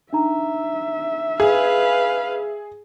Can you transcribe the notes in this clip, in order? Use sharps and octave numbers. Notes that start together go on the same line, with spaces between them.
D4 D#4 E5 A#5
G#4 B4 F5